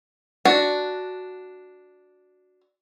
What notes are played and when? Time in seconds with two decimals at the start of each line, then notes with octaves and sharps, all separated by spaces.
0.45 D4 F#4